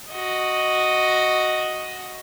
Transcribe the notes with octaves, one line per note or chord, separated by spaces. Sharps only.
F#4 D#5